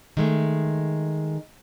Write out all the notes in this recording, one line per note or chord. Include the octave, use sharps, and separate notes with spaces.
D#3 G#3 A3